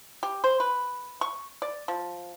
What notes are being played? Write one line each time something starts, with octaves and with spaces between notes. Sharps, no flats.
G4
C5
B4
C#6
D5
F3